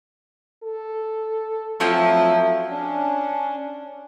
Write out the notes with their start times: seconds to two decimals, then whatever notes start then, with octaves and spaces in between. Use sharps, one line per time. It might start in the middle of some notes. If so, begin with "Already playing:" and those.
0.64 A4
1.80 F3 F#3 A3 C4 E4
2.68 C#4 D4